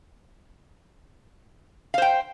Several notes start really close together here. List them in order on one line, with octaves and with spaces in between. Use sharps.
F5 C5 G5